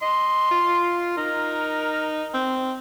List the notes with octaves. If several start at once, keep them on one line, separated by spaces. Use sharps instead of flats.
D#5 C6
F4
D#4 A#4
C4